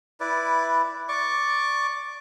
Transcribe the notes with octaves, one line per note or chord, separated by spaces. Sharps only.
E4 B4 D5
D5 C#6 D6